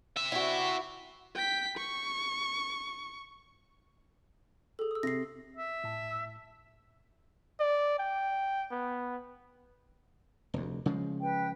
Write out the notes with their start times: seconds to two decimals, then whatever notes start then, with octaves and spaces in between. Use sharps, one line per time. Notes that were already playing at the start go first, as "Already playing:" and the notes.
0.17 C5 E5
0.32 E4 F#4
1.35 G5 B6
1.77 C#6
4.79 G#4 A4
4.91 D#6 E6
5.03 C3 A#6 C7
5.57 E5
5.84 A2 A5
7.60 D5
7.99 G5
8.72 B3
10.54 F1 D2
10.86 C#3 F3 G#3
11.21 B4 G5